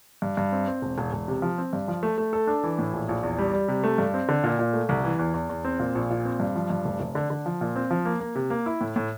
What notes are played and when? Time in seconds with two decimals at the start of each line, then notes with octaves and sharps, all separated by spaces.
0.22 G2
0.37 G2
0.52 C4
0.67 C4
0.82 E1
0.98 E1
1.13 E1
1.28 C3
1.42 F3
1.58 C4
1.73 G2
1.88 F3
2.03 A3
2.18 A3
2.33 A4
2.47 D4
2.63 E3
2.78 A2
2.93 A#1
3.09 A#1
3.23 E2
3.39 G3
3.53 G3
3.68 C3
3.84 A3
3.98 G2
4.14 C4
4.29 D3
4.43 A#2
4.59 A#2
4.73 A3
4.89 C2
5.04 E3
5.19 E2
5.34 E2
5.50 E2
5.64 C4
5.79 A#2
5.95 A#1
6.10 A#2
6.25 C4
6.40 G2
6.55 F3
6.70 G2
6.85 F1
7.00 F1
7.15 D3
7.30 D3
7.46 F3
7.61 A#2
7.76 C4
7.90 F3
8.05 A#3
8.20 A#3
8.35 C3
8.50 A#3
8.66 E4
8.81 A2
8.96 A2